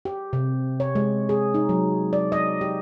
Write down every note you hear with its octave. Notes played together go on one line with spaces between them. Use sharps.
G4
C3
C#5
G#3
G#4
D#4
F#3
D5
D#5
G4